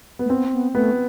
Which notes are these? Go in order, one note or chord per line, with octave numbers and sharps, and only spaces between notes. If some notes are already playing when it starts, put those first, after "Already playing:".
B3
A3
B3 C4
B3
A3 B3